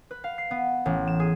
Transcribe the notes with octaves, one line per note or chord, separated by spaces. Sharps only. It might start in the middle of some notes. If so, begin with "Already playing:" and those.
B4
F5
C7
B3
A1
E7
G#4